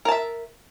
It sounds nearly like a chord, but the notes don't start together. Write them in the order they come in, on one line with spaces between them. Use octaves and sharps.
A#4 A5 E5